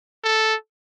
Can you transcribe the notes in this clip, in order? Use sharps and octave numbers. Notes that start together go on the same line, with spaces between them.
A4